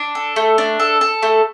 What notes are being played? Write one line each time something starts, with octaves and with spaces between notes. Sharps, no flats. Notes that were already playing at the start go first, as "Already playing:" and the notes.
Already playing: D4
A4
A3
D4
A4
A4
A3